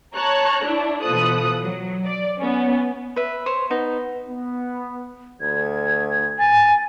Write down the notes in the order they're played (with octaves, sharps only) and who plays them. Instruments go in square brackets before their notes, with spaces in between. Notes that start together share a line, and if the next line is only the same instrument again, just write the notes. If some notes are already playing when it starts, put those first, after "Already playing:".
[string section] C#5 A5 A#5 F#6
D4 E4
B2 E3 F3 A4 D#6 F#6
F#3
D5
B3 C#4
[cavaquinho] B4 E5
C5 C#5
[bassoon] B3 [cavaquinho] D#4
[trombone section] B3
[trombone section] D2 [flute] G#6
[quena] G#5 [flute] A6